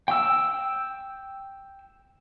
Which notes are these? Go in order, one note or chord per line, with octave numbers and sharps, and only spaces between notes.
G5 E6